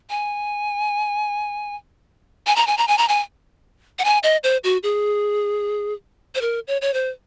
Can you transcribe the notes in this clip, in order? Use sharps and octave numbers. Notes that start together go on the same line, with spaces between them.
G#5
G#5
A#5
G#5
A#5
G#5
A#5
G#5
F#5
G#5
D#5
C5
F#4
G#4
C5
A#4
C#5
C#5
C5